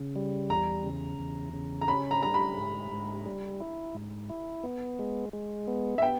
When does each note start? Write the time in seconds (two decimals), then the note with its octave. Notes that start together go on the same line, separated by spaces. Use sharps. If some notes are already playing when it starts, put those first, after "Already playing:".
Already playing: C#3
0.16 G3
0.49 E2 A#5
0.84 C#3
1.19 E2
1.53 C#3
1.81 A#5
1.88 C#4 B5
2.11 A#5
2.23 G3 A#5
2.34 B5
2.57 G#2
2.91 G#2
3.26 G3
3.60 E4
3.95 G#2
4.29 E4
4.64 B3
4.99 G#3
5.33 G#3
5.67 B3
5.98 E5
6.02 B3 G5